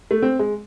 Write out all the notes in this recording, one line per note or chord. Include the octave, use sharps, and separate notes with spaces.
A3
C4
G#3